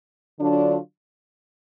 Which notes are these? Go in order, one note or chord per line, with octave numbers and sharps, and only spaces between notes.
D3 F#3 D4 F4